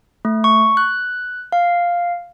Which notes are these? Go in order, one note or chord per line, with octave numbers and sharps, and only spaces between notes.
A3
C#6
F#6
F5